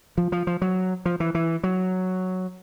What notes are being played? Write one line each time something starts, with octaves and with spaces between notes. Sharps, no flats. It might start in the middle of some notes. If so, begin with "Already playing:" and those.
F3
F3
F3
F#3
F3
E3
E3
F#3